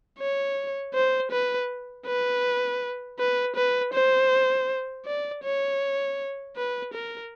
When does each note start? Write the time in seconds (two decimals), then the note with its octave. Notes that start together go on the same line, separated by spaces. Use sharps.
0.19 C#5
0.94 C5
1.31 B4
2.06 B4
3.19 B4
3.56 B4
3.93 C5
5.06 D5
5.44 C#5
6.57 B4
6.94 A#4